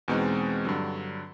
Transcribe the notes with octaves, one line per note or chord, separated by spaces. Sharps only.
E2 B2 G#3 C4 D#4
G2 D3 F#3